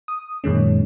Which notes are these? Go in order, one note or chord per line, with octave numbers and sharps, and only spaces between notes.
D#6
F#2 A#2 D#3 G#3 C#4